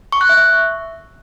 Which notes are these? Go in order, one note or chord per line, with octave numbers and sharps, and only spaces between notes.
C#6
F#6
E5